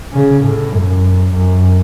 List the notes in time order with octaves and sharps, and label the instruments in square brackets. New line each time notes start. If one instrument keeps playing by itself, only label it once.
[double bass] C#3
A2
F#2
F#2